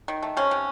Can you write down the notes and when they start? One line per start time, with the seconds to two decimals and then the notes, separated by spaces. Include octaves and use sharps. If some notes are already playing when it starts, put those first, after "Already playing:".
0.08 D#3
0.22 A3
0.37 C3 C#4
0.51 C3